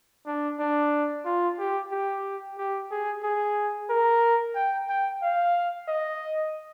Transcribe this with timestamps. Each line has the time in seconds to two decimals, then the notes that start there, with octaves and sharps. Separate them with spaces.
0.26 D4
0.60 D4
1.25 F4
1.59 G4
1.92 G4
2.58 G4
2.91 G#4
3.23 G#4
3.90 A#4
4.55 G5
4.89 G5
5.22 F5
5.88 D#5